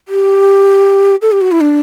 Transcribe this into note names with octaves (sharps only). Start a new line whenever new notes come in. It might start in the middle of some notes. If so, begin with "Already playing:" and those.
G4
A4
G4
F#4
E4
D4